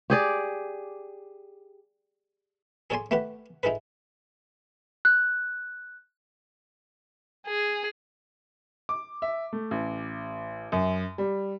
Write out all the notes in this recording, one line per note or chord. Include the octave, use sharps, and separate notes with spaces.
G4 G#4 D5
G#4 A4 C#5 D5 G#5 C6
A3 G4 B4 F#5
D#4 E4 G#4 A4 B4
F#6
G#4
D6
E5
A3
A1
F#2
G3